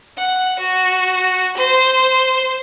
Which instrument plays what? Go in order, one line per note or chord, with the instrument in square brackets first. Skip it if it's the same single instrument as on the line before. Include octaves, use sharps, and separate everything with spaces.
[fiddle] F#5
F#4
C5